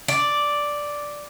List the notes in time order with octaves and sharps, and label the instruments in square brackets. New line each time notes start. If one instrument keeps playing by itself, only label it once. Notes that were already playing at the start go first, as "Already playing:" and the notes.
[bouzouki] D5